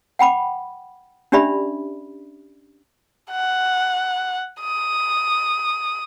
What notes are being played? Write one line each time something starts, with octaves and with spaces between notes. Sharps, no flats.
F#5 G5 B5 D6
C#4 D4 G4 D5 E5 B5
F#5
D#6